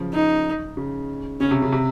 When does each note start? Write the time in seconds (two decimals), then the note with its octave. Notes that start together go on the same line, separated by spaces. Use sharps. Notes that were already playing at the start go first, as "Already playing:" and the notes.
Already playing: C#3 F3
0.13 D#4
0.77 C#3
1.40 C#3 C#4
1.51 C3
1.62 C#3
1.72 C3